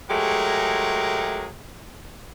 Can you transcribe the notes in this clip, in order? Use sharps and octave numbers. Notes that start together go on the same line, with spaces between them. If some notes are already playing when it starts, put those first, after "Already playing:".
F#3 G#3 A3 G4 G#4 A#4